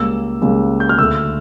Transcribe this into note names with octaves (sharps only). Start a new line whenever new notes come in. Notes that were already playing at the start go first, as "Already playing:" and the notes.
Already playing: C#2 C#3 G3 A#3 E6
C#2 C#3 G3 A#3
G6
F6
D2 D3 A3 E6